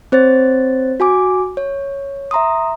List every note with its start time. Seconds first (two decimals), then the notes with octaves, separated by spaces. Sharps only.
0.12 C4 C5 C#5 A6
1.00 F#4 G#5 D6
1.57 C#5
2.31 E5 A#5 C6 D#6